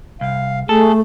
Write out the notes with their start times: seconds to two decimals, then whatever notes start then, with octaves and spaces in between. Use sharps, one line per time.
0.21 C2 F5
0.69 A3 G#4 A4